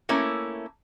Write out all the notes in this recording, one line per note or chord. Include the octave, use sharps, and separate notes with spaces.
A3 A#3 C#4 E4